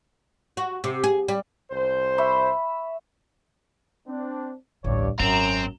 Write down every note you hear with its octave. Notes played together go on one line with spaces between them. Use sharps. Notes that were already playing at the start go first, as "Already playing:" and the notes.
F#4
C3
G#4
G3
C2 C5
E5 B5 C#6
C4 D4
A1 D2 G2 C#5 D5
G#1 F#2 C4 A#5